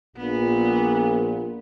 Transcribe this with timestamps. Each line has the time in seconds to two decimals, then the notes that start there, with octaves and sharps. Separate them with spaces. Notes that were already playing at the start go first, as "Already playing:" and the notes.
0.17 A#1 A#2 B3